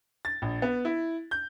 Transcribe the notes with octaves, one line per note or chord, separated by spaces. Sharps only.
A6
A#1
B3
E4
G6